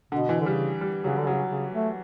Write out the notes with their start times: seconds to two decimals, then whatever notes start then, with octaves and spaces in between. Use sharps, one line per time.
0.12 B2 D3
0.29 E3
0.41 D3
0.46 C#3 G3
0.81 G3
1.04 C#3 F#3
1.18 D3
1.26 C#3 F#3
1.50 C#3
1.73 A3